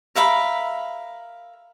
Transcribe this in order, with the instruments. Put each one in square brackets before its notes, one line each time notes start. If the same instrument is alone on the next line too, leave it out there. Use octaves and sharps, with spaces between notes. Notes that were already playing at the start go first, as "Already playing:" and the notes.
[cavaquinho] A#4 E5 F5 B5